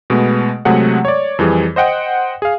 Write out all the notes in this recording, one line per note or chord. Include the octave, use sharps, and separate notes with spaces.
B2 G#3 A3 B3
C3 F#3 G#3 A3 G#4 F#5
C#5 D5
F2 E3 G3 G#4
C5 D#5 F#5 G5
G#4 F5